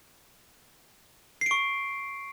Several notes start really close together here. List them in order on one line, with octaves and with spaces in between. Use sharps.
C7 D7 C#6